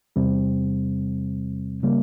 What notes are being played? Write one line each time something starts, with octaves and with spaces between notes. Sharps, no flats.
E2 C3 G3 C4
C#3 G3 A#3